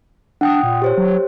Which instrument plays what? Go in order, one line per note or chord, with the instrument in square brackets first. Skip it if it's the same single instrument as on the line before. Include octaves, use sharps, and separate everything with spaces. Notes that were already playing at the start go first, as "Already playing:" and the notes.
[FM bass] D4 [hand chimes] F#5 G5 D#6
[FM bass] A#2
[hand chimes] G4 C5 C#5
[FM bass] F#3